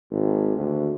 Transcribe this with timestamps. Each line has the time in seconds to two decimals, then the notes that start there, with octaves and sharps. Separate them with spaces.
0.11 G#1
0.56 D2